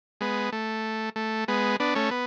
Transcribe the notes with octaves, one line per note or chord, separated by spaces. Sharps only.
G#3 B3
A3
A3
G#3 B3
B3 D4
A3 C#4
B3